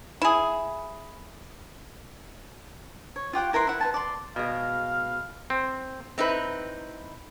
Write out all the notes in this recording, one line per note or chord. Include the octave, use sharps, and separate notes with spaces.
E4 G#4
C#5
F4 G4 F#5 G5
E4 A#4 B4 C6
E4 B4 F#5
B4 G#5 A5
D5 C6
B2 G#3 F5
C4
C4 D#4 E4 B4